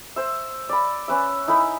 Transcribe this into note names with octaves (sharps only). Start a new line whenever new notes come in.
C5 E5
D5 B5
C#4 B4 E5
D#4 E4 A#4 B5